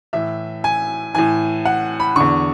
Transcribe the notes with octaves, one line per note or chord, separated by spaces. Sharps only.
A2 E3 E5
G#5
A2 E3 G#5
F#5
B5
E2 D3 C#6